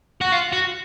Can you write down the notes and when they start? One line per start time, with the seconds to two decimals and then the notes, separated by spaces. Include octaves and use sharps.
0.21 F#4
0.32 F4
0.53 F#4